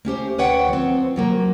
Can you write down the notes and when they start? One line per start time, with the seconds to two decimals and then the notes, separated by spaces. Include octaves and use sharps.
0.05 A3 C#4 G4 C5
0.38 D2 B4 C#5 F#5 G5
0.69 F3 C4
1.16 C3 F#3 A#3